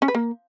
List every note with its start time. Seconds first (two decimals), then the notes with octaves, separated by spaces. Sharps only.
0.02 C#4
0.08 B4
0.15 A#3